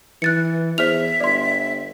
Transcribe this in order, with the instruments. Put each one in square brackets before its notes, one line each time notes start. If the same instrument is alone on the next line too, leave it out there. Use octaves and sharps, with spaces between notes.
[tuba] E3 [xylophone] F#6 A6 C#7
[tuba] E2 [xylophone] C5 F6 F7 [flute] E5
[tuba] G1 [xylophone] D5 C6